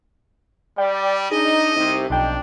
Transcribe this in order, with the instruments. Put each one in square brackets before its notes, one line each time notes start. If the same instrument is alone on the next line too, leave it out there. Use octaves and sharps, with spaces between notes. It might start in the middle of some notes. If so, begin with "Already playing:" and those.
[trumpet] G3 [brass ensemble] D5 [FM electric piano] G5
[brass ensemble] D4 D#4 [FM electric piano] G#4 [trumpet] D#5
[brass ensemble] C2 C3 [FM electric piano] D#4
[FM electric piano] B1 G5 [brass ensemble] F2 D#4 [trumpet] D4